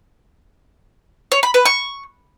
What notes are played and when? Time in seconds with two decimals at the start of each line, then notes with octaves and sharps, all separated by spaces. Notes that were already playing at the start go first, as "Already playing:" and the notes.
1.32 C#5
1.43 B5
1.54 B4
1.65 C#6